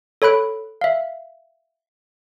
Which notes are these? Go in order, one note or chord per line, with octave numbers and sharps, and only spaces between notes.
A4 C#5 B5 F#6 D7
E5 F5